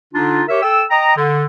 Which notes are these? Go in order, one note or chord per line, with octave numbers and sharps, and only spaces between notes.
D3 D4 D#4 F4
G4 A#4 C#5 E5
A4 G5 E6
D#5 G5 A#5
D3